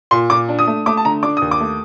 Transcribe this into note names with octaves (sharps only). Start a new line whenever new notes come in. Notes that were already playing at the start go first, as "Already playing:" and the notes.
A#2 C6
A#2 D6
D4
D#6
A3
A3 D6
A5
D3 A#5
D4 D6
D#2 D#6
D6
A3